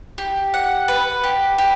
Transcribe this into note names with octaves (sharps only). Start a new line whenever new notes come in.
G4
F#5
B4
G4
G4